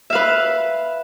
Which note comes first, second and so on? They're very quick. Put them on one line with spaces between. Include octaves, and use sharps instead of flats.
E5 F5 B4